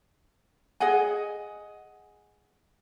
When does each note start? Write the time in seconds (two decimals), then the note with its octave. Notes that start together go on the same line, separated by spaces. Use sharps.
0.80 G#4 D#5 F#5 G#5